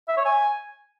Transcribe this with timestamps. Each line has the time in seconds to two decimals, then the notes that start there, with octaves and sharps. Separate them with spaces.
0.08 E5
0.17 C#5
0.26 G#5